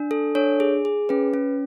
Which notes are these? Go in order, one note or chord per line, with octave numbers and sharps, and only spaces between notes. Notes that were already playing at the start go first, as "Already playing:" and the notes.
Already playing: D4
A4
D4 C#5
G#4
G#4
C#4 B4
C#4